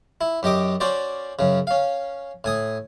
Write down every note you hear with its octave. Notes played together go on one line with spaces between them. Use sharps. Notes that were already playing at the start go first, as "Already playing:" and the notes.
E4
F#2 G4 D#5 D6
C#4 F#4 C5 D5
F#2 C#3
C#4 F5
A2 G#5 D#6